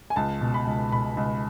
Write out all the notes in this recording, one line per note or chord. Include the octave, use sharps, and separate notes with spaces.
G#5
C#2 A5
B2
B5
C#2
B2 B5
C#2